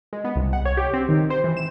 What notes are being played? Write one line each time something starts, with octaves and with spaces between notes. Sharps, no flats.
G#3
B3
C2
F#5
C#5
G4
C4
D#3
C5
E3
E7